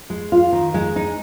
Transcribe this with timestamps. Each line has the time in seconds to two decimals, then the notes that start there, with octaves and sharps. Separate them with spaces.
0.10 G#3
0.32 F4
0.52 D#3
0.74 G#3
0.96 D#4